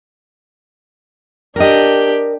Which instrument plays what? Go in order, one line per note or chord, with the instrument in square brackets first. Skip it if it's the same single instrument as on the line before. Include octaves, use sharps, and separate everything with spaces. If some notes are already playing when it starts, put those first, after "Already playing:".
[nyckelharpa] D4 G4 [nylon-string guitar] A#4 D#5